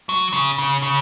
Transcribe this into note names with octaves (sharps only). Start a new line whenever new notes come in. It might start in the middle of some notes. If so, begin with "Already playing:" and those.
F#3
C#3
C#3
C#3